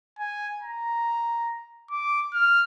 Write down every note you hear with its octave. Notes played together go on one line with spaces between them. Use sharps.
G#5
A#5
D6
F6